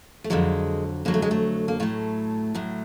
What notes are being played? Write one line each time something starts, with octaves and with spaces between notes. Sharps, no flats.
A3
F2 D3 F#3 G#3
F2 D3 F#3 A#3
A3
G#3
A3
A#3
A2 F#3 A3
A2 F#3